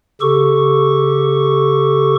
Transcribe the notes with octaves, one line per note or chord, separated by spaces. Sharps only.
C#3 G4 A4 C#6